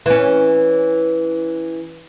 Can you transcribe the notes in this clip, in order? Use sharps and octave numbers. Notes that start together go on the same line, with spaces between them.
E3 C#4